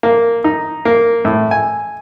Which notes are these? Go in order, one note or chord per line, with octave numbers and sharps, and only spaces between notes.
A#3
D#4
A#3
A2
G#5